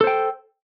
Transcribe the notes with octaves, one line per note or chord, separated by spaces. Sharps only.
A4 C5 G5